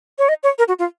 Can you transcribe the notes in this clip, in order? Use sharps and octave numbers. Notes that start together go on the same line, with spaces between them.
C#5
D#5
C#5
A#4
F#4
F4